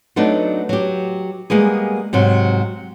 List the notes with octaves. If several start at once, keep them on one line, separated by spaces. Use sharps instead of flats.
F#3 A3 B3 D4 D#4
F#3 G4
G3 G#3 A#3 B3 G#4
G#2 C3 F#3